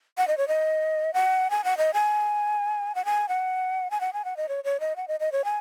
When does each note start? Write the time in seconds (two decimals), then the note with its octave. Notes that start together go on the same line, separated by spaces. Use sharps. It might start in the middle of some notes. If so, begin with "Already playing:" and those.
0.18 F#5
0.28 D#5
0.37 C#5
0.48 D#5
1.14 F#5
1.50 G#5
1.64 F#5
1.78 D#5
1.94 G#5
2.95 F#5
3.05 G#5
3.29 F#5
3.91 G#5
4.01 F#5
4.13 G#5
4.25 F#5
4.37 D#5
4.49 C#5
4.64 C#5
4.80 D#5
4.96 F#5
5.08 D#5
5.20 D#5
5.32 C#5
5.45 G#5